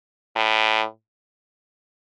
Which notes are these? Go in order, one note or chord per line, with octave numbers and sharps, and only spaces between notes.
A2